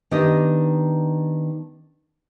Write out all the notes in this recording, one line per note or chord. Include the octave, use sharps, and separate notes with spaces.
D#3 B3 D4 D#4 G4 D#5